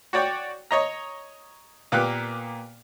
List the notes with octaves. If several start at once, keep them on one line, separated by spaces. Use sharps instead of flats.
F#4 C#5 D5 G5
C#5 D#5 A#5
A#2 A#3 B3 G4 F#6